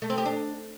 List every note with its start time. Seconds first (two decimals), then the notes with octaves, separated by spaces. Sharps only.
0.02 A3
0.10 C4
0.18 G4
0.26 D4